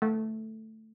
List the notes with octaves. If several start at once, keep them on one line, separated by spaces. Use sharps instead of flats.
A3